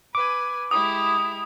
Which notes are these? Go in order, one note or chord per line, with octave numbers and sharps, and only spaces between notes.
B4 G#5 D6
G#3 E4 G4 D#6